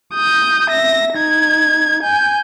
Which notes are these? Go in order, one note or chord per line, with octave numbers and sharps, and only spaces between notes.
D#6 G6
E5 A#6
D#4 G#6
G#5 G6